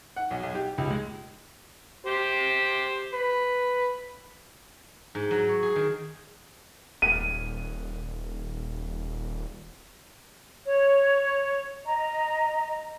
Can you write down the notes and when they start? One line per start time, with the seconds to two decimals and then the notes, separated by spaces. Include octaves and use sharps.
0.16 F#5
0.31 B1
0.43 B1
0.55 G4
0.78 C#2
0.90 G#3
2.06 G4 C5
3.13 B4
5.15 G#2
5.31 F#3
5.48 C#5
5.63 G#4
5.76 D#3
7.02 D#1 D#7
10.66 C#5
11.86 D#5 A#5